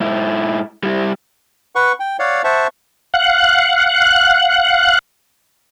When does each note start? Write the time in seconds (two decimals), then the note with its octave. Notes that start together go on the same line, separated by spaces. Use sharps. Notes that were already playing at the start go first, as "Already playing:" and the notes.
0.01 G#2 E4
0.83 G3 E4
1.75 B4 F#5 C#6
2.00 G5
2.19 C#5 D5 F5 F#5
2.44 C5 E5 F#5 A5 C#6
3.14 F5 F#5 F#6